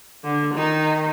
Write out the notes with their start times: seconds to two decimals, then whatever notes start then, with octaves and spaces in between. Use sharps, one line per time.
0.24 D3
0.54 D#3 D#4